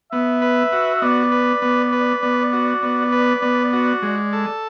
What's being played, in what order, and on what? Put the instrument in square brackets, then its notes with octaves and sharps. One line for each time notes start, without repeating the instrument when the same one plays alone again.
[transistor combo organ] B3 [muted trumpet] E5
[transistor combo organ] B4
F#4
[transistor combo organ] B3 [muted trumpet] D5
[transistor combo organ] B4
B3
B4
B3
F#4
B3
B4
B3
F#4
G#3
A4